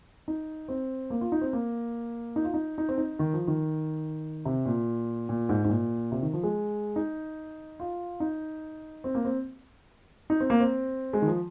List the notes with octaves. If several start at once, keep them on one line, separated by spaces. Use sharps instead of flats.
D#4
C4
A#3
F4
D#4
C4
A#3
D#4
F4
D#4
D#4
C4
D#4
D#3
F3
D#3
C3
A#2
A#2
G#2
G#2
A#2
C3
D#3
F3
G#3
D#4
F4
D#4
C4
A#3
C4
D#4
C4
A#3
C4
G#3
D#3
F3